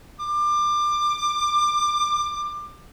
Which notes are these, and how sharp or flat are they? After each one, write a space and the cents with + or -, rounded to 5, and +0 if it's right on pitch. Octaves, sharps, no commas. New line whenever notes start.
D6 +25